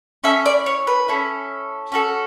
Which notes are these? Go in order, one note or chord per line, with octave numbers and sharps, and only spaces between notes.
C#4 E4 A4 E5
D5
C#5
B4
C#4 E4 A4
C#4 F#4 A4